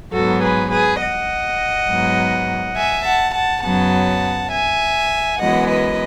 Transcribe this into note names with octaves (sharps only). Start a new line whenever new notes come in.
G#2 F#3 B3 F#4 A4
G#4 B4
G#4 B4
D#5 F#5
G#2 F#3 B3
E5 G#5
F#5 A5
F#5 A5
F#2 C#3 F#3 B3 F#5 A5
E5 G#5
F#2 E3 G#3 B3 D#5 F#5
B4 D#5